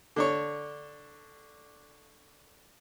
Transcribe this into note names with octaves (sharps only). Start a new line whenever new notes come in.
D3 D4 C#5